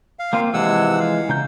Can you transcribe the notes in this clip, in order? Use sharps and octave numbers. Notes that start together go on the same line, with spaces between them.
F5
A#3 C4 F4
C3 E3 F3 G#3 F#5 E6
F5
C#3 A#5 G6